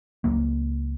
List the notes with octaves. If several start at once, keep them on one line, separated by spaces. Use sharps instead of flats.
C#2 F#3 A#3